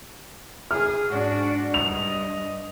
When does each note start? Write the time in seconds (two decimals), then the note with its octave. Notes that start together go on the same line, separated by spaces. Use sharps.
0.71 G#4 F6
1.10 G#2 D4 F#4
1.74 G2 D#5 F7